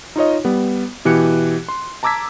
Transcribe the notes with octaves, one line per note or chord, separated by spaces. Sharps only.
D#4 F4 C#5 D#5
G3 B3
B2 E3 G4 F#6 C#7
C6
A5 A#5 D6 E6 G#6 B6